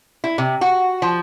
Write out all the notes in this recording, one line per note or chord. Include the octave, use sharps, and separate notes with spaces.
E4
C3
F#4
F3